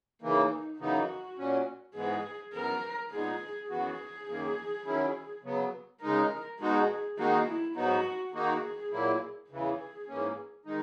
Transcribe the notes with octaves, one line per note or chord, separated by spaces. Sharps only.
C#3 E3 A#3 D#4
F#2 C#3 E3 B3 D#4 F#4
A#2 F#3 C#4
G#2 E3 G#3 B3 G#4
F#2 E3 B3 A#4
A#2 G#3 B3 D#4 G#4
F#2 E3 B3 F#4 G#4
F#2 D#3 A#3
D#3 F#3 C#4 E4
C#3 F#3 B3
C#3 G#3 D#4 A#4
B2 G#3 D#4 F#4 G#4
D#3 G#3 A#3 D#4 F#4
E4
G#2 F#3 B3 D#4 F#4
D#3 A#3 D#4 F#4 G#4
A#2 F#3 A#3 E4
E2 C#3 E3 G#4
G#2 E3 A#3 C#4
D#3 G#3 D#4